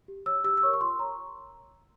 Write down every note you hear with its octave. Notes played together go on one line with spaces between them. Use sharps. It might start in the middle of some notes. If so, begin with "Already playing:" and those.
G4
C#5 E6
G4 E6
E6
A#4 C#5 C#6
C#6
F4 C6
A#4 C#5 A#5